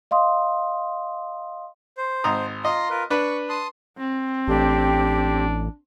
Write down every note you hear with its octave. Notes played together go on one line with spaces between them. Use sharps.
D#5 F5 C6 D#6
C5
G#1 A#5 D#6
F4 D#5 A#5 C6
F4 A#4 B4
D4 B4 C#6
A5 C6 D#6
C4
A1 D4 G4